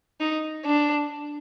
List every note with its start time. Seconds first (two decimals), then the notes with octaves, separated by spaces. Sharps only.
0.20 D#4
0.65 D4